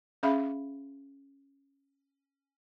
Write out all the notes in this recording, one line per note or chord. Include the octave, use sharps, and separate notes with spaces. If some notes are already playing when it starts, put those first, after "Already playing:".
C#4 G#4 E5 F5 B5